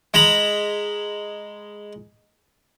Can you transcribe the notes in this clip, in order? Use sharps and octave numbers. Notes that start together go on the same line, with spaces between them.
G#3 A#5 B5